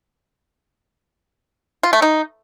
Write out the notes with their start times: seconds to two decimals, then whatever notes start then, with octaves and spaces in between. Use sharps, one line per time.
1.83 F4
1.93 A3
2.02 D#4